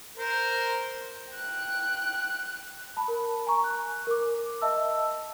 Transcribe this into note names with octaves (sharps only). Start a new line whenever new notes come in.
A#4 C5
G5 F#6
A5 B5
A#4
G#5 A#5 C#6
F#6
A#4 D6
D#5 E5 A5 E6